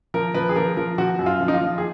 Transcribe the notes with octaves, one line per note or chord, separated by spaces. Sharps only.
F3 A#4
F3 B4
G#4
F3 A#4
F3 A#4
F3 F#4
F#2
F4
F3
D#4
F4
F3
G#4